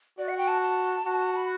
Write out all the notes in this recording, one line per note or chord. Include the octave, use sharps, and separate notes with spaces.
F#4 D5
F#5
G5
A5
A5
F#4
B5